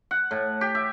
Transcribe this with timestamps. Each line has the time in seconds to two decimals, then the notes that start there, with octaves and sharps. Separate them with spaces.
0.11 F#5
0.31 A2
0.61 G4
0.75 E5